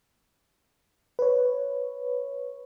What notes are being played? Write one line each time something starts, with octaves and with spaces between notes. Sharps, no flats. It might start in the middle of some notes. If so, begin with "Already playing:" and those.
B4 C#5